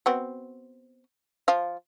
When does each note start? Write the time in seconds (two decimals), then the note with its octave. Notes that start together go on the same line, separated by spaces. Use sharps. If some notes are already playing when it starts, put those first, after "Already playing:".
0.06 B3 C4 F#4
1.48 F3 F5